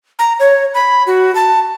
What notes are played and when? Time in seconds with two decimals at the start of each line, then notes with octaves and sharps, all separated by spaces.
0.19 A#5
0.40 C#5
0.74 B5
1.07 F#4
1.35 A5